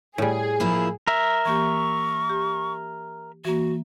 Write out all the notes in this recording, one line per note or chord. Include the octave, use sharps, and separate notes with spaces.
A2 G3 G#4
F3 A#3 E4
A#4 E5
E3 A#3 G4 C#6
G4
E3 A#3 F#4